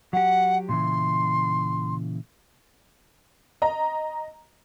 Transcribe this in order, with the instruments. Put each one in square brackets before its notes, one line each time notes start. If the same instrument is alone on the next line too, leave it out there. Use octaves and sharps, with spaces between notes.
[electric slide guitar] F#3 G4 [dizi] F#5
[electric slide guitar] A#2 C#3 E3 [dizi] C6
[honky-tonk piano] D#5 A#5